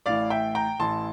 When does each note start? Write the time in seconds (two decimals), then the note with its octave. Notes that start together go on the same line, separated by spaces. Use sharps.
0.06 A1 A2 E3 D5 F5
0.30 E5 G5
0.55 G5 A#5
0.79 A1 A2 E3 A5 C6